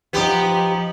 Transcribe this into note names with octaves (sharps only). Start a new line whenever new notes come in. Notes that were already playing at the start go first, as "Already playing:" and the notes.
F3 B3 D#4 G4